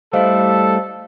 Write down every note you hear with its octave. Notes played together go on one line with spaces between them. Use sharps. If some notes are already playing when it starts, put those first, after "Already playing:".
G3 A3 E4 A4 C5 D#5 F5